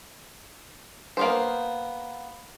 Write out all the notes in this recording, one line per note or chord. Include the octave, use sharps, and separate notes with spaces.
A#3 B3 C5